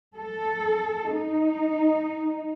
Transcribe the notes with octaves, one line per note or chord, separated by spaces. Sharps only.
A4
D#4